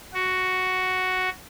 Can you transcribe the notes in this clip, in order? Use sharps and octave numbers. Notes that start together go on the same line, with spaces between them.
F#4